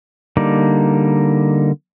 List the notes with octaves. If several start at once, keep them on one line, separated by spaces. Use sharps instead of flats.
D3 G3 A#3 D#4 D5